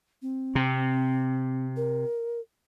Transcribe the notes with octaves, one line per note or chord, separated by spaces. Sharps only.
C4
C3
A#4